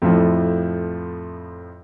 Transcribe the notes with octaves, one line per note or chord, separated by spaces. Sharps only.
F2 A2 F3 E4